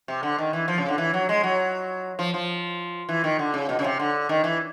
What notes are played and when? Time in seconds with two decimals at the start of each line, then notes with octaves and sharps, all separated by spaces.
0.08 C3
0.23 D3
0.38 D#3
0.53 E3
0.68 F3
0.78 C#3
0.88 D3
0.98 E3
1.14 F#3
1.29 G#3
1.43 F#3
2.19 F3
2.34 F3
3.09 E3
3.24 D#3
3.39 D3
3.54 C#3
3.69 B2
3.79 C#3
3.84 C3
3.99 D3
4.29 D#3
4.44 E3